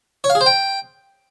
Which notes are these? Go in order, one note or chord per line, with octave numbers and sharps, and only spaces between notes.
C#5
F5
G#4
C5
G5